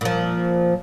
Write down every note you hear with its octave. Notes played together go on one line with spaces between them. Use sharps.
A#2 F3